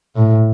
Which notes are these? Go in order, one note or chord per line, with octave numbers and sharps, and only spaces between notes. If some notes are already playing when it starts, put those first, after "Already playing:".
A2